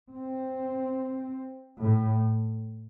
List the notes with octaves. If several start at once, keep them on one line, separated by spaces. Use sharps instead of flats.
C4
A2